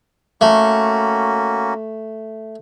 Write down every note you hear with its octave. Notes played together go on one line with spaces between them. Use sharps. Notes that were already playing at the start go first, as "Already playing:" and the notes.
A3 A#3 C#4 F#4